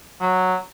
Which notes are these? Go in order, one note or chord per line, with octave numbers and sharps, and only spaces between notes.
F#3